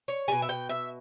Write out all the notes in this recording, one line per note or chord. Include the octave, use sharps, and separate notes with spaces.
C#5
B2 G3 G#5
E5
G5
E5